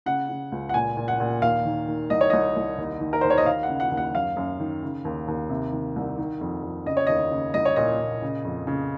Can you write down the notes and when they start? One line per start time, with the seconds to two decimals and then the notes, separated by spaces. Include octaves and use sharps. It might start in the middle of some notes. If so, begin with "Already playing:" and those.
0.06 C#3 F#5
0.29 C#3
0.52 C#2
0.69 F#5
0.74 A#2 G#5
0.97 A#2
1.08 F#5
1.20 A#2
1.42 D#2 F5
1.65 D#3
1.88 D#3
2.10 C2 D#5
2.21 C#5
2.30 C2 D#5
2.56 C2
2.78 D#2
3.00 D#3
3.13 A#4
3.21 D#2 C5
3.30 C#5
3.38 D#5
3.46 D#2 F5
3.63 F#5
3.69 C#3
3.80 F#5
3.92 D#2
3.97 F#5
4.15 F#2 F5
4.37 F#2
4.60 D#3
4.82 C#3
5.05 D#2
5.28 D#2
5.50 C3
5.72 D#3
5.96 C2
6.18 D#3
6.41 F2
6.63 F2
6.86 C#3 D#5
6.97 C#5
7.07 D#2 D#5
7.31 C#3
7.54 C2 D#5
7.65 C#5
7.76 A#2 D#5
8.00 A#2
8.22 C#3
8.45 F2
8.67 C#3